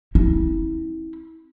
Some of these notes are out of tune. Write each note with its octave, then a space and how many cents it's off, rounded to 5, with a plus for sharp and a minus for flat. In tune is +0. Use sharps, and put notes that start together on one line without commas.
C4 +35 E4 -30